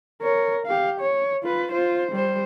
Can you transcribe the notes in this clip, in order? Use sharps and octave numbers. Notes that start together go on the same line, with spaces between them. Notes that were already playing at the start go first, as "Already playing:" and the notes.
A#4 C#5
G4 F5
C#5
F4 B4
F4 C5
G3 C5